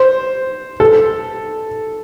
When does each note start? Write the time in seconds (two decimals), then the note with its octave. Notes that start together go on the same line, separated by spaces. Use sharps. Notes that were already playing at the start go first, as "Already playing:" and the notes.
Already playing: C5
0.80 A4